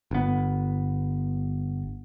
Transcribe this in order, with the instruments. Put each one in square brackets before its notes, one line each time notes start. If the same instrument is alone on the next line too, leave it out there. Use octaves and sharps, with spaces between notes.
[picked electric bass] G1 B3